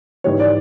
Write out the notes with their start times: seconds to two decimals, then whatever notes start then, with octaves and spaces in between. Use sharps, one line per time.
0.24 G#2 E3 G3 C#5
0.40 D5